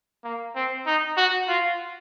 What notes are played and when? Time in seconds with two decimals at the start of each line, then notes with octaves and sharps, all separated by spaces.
0.24 A#3
0.55 C4
0.86 D#4
1.17 F#4
1.48 F4